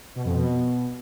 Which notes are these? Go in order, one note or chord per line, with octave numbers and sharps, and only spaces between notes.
B2
F2
B2